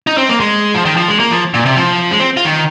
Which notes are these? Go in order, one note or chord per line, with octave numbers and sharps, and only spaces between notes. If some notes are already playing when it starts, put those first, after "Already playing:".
D#4
C4
A#3
G#3
F3
D#3
F3
G#3
A#3
F3
A#2
C3
F3
G#3
C4
F4
D#3